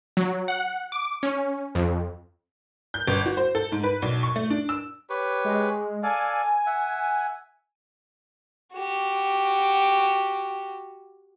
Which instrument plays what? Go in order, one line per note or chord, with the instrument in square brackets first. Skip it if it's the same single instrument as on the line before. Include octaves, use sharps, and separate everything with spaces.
[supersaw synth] F#3
F#5
D6
C#4
F2
[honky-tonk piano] G6
G1
F#4
C5
A4
G#2
B4
B1
C#6
A3
D4
E6
[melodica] G4 B4 C#5
[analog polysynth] G#3
[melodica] A4 D5 F5 [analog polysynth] G#5
[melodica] E5 F#5
[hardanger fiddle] F#4 G4